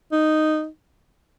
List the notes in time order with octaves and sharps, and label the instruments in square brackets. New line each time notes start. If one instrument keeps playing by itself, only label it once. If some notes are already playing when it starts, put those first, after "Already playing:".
[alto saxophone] D#4